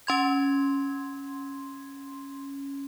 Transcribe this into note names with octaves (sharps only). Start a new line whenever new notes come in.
C#4 C6 G#6